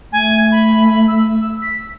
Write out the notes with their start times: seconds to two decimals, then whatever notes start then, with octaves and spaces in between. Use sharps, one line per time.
0.12 A3 G#5
0.51 B5
1.07 E6
1.62 B6